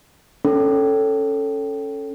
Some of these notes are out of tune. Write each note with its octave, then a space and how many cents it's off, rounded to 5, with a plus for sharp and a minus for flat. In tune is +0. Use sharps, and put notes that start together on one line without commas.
C#4 +0 A4 +0